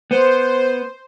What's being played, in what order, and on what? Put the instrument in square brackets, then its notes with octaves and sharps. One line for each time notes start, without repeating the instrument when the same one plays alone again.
[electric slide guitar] B3 [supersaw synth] C5